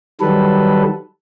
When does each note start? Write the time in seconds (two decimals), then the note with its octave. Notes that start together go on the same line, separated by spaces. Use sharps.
0.21 D#3 F#3 G3 A4 B4